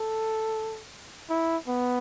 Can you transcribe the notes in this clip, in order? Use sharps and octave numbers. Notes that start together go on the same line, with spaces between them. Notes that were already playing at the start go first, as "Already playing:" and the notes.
Already playing: A4
E4
B3